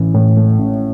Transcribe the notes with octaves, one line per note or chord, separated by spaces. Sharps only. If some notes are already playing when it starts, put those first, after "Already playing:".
Already playing: A1 E3
A2
A3
A1